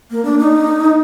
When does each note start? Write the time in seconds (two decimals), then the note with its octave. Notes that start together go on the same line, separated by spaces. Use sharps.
0.11 A#3
0.25 D4
0.39 D#4